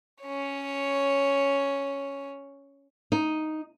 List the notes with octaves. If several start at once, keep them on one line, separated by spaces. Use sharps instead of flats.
C#4 C#5
D#4